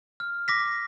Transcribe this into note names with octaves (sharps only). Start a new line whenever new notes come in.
F6
D6 A#6 B6